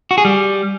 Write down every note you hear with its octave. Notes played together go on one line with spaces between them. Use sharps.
F#4
G#4
G3